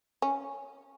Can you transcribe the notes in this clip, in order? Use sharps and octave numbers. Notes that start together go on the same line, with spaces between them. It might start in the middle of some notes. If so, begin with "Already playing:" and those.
C#4